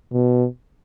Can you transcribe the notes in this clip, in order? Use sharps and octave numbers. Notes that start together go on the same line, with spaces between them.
B2